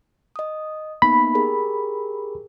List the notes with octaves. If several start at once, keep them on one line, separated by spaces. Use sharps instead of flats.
D#5 D#6
A#3 B3 D#4 B5
G4 G#4 A#4